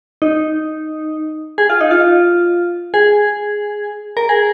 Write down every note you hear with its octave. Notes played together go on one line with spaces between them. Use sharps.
D#4
G#4
F4
D#4
F4
G#4
A#4
G#4